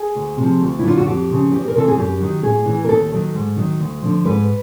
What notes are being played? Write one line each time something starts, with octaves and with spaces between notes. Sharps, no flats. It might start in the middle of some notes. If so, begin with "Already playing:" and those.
Already playing: G#4
D2
C3
F3
D2
E4
D3 F#3 F4
F#4
F2 G4
C#3 F3
E2 G4
A#4
C3 E3 A4
G#4
F#2 G4
D#3 F#3
A2 G#4
E3
A#4
D#2 A4
D#3 F#3
G#2
D#3 F#3
D2
D3 F3
G#2 B4